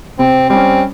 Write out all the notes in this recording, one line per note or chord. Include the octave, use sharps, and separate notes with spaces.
C3 C4
G3 C4 C#4